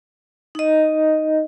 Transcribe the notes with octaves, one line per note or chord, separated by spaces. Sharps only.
D#4 D#5